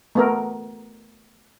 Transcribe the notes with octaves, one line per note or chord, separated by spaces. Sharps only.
A3 B3 A#4